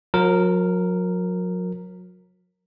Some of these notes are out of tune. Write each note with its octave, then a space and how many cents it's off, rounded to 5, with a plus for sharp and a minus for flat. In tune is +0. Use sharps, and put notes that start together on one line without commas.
F#3 -40 A#4 -5